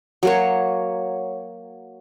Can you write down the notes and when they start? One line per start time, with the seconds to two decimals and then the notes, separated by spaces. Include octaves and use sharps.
0.23 F#3 A#3 C#5